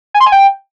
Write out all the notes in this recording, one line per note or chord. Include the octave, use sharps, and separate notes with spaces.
G#5
C6
G#5
G5